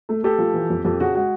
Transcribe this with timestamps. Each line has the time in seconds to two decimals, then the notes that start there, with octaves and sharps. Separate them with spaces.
0.09 A3
0.23 A3 G4 A4
0.38 F3
0.54 E3
0.70 F2
0.85 F2 G4 A4
1.00 C#3 F#4 G#4
1.15 G#3 F#4 G#4